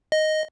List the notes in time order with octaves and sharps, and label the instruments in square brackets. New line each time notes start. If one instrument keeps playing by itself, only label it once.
[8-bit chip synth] D#5